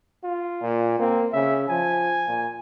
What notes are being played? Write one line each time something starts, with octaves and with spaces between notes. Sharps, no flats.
F4
A#2
A#3 C4
C#3 E5
F3 G#5
A#2